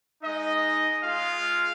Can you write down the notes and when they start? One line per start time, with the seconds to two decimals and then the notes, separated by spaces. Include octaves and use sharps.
0.23 G#3 D#4 D#5
1.04 G#3 F4 F5